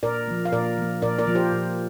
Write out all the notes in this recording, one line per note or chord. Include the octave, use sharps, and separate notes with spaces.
A#2 A#4 D5
F3 A#3
F5
A#2 A#4 D5
F3 A#3
A#2 A#4 D5
A#4 D5
F3 A#3
G4 C5
A#2